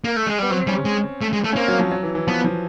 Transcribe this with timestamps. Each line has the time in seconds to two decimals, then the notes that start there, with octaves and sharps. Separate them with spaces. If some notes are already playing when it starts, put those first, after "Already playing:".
0.04 A#3
0.16 A3
0.27 G#3
0.39 G3 B3
0.50 F#3 C4
0.67 G3 C#4
0.85 G#3
1.22 A3
1.33 G#3
1.44 A3
1.53 C#4
1.56 A#3 C4
1.68 F#3
1.79 F3
1.92 F#3
2.03 E3
2.15 E3
2.27 F3 B3
2.44 F3